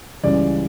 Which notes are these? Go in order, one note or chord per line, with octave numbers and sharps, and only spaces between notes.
C#2 C#3 E3 G3 D5